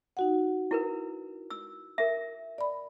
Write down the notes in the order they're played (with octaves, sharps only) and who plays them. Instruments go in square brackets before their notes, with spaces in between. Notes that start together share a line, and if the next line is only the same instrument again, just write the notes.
[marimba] D#4 F#4 F#5
[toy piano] E4 A#4 B4
E6
A#4 E5
[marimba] D5 B5